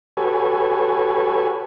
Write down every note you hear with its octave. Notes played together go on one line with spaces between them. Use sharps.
F#4 G4 A4 B4 C#5 G#5